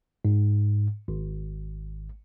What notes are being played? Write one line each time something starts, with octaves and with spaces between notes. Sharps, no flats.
G#2
G#1